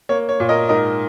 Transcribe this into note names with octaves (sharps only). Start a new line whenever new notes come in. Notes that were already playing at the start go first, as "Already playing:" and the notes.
A#3 C#5
C#5
A#2
A#4 D#5
G#2 A#4 D#5